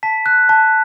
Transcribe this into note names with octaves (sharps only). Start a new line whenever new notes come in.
A5 B6
F#6
A5